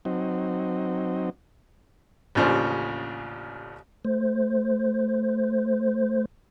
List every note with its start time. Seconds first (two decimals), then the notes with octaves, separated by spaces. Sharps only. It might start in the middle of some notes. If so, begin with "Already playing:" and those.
0.05 F#3 C4 D#4
2.35 A1 D#2 C#3 F3 D4 C5
4.05 A3 C5